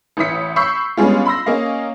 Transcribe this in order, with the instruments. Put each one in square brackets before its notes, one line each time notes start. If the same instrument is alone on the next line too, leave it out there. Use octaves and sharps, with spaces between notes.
[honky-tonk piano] A1 E3 E4 D#6 B6 C#7
B5 C#6 E6 G6 B6 C7
G3 G#3 B3 C#4 D4 F4
B5 C6 E6 A#6
A#3 C#4 D#5 F5